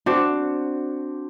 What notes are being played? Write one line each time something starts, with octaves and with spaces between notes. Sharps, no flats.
C4 D4 F#4